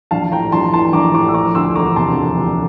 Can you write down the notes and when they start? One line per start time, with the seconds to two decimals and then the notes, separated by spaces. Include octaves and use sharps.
0.11 A#1 F5 A5
0.32 A2 G5 A#5
0.52 A#1 A5 C6
0.72 E3 A5 C6
0.93 A#1 A#5 D6
1.14 A2 A#5 D6
1.28 E6
1.34 F3 A#5 D6
1.55 D2 C6 E6
1.75 E1 A#5 D6
1.96 C3 A5 C6
2.17 F3
2.37 D2